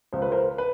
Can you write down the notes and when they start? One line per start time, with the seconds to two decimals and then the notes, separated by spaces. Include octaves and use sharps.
0.13 C#2 C5
0.22 B4
0.32 A#4 C5
0.58 B4